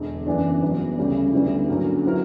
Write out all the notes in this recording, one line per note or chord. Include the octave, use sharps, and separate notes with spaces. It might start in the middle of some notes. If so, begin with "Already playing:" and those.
Already playing: E1 E2 D3
F#1 F#2 E3 B3 D4
G1 G2 F#3 B3
D2 C#3 G3 C#4 G4
D2 D3 G3 B3 E4
G2 D3 F#3 A#3 C#4
F#3 B3 E4 A#4